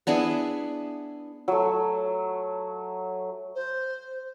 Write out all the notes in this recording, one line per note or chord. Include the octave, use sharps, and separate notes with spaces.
B3 D4 E4 G#4
F#3 A3
C5